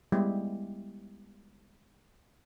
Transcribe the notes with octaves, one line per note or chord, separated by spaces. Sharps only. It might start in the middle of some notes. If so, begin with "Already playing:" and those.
G3 G#3 B3 E4 G4